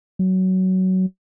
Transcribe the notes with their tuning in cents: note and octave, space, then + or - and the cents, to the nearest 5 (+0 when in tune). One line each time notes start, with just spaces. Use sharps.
F#3 +15